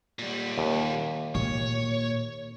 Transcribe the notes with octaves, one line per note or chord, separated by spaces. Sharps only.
A#2 G3
D#2
A#2 C#5